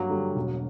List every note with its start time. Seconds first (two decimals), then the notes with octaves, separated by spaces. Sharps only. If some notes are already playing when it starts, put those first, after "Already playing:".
Already playing: G2 F#3 A#3
0.09 D3 G3
0.36 E1